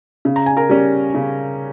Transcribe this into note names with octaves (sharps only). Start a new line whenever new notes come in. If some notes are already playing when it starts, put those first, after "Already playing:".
C#3
A#5
G#5
A#4 A#5
G3 C#4
C#3